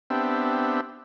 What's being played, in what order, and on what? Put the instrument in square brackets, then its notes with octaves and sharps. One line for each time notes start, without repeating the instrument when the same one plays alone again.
[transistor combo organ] B3 C4 D4 G4 E5